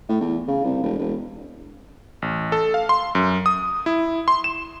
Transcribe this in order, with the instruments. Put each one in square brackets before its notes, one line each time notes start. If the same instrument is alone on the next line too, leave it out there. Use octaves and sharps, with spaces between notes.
[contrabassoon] A2
E2
C#3
C2
E1
E1
[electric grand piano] A1
A4
F5
C6
F#2
D#6
E4
C6
E7